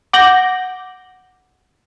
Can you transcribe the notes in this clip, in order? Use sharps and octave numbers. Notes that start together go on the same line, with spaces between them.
F#5 D6 G6 A#6 F#7